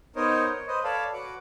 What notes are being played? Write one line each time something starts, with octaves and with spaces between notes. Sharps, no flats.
B3 D#4 A#4 C5 C#5 D#5
C#5
B4 C5 D#5
A4 C#5 D5 F5 A5 B5
F#4 B4 F#5 D6